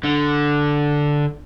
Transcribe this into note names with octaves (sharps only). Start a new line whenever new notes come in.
D3